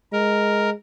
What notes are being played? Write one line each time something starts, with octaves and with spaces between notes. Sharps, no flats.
G#3 A#4